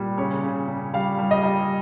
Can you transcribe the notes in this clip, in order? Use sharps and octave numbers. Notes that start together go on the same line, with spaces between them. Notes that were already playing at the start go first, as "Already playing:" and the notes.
Already playing: A#2 G3
C#3 C#5
C#3
C#3
G3 F5
G3
D#5
G3